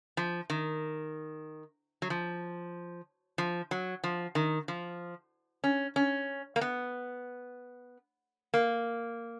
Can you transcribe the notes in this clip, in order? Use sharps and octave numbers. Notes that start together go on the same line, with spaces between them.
F3
D#3
F#3
F3
F3
F#3
F3
D#3
F3
C#4
C#4
A#3
B3
A#3